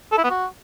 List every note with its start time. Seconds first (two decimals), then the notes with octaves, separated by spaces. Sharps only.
0.12 A4
0.18 E4
0.24 B3
0.30 F#4